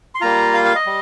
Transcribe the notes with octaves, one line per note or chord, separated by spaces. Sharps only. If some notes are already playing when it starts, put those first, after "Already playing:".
C6
G3 A#3 F4 A#5
F5
F5
D#5
G3